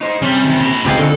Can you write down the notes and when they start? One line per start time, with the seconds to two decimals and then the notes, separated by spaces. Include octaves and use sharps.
0.01 D#4 C5
0.22 C3 G3 C#4
0.45 D#3 G3
0.60 A#2 B5
0.85 C#2 B3 C4 D#4 F4 G4 F5 G#5
0.99 D3 A4